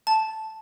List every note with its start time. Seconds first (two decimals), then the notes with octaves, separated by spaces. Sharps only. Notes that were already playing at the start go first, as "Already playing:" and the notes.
0.07 A5